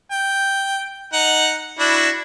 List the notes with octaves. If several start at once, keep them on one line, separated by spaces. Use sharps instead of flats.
G5
D#4 F#5
D4 E4 F#4